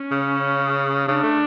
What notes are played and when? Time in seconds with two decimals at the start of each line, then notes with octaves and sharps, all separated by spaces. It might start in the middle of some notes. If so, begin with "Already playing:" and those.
Already playing: C#4
0.11 C#3
1.08 C#3 D4
1.23 A3